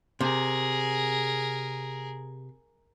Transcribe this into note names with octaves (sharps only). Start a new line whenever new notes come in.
C3 G#4 A#4